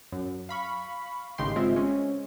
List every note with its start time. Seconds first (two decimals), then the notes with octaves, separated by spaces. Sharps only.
0.12 F#2
0.49 F5 B5 C#6
1.38 G#1 A2 C#3 D#4 G4 C6
1.56 G#3 C4 F4 E5
1.76 G#3 C#4